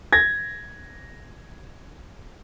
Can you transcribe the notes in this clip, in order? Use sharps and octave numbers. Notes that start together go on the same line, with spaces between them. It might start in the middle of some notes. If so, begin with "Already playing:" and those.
G#6 A#6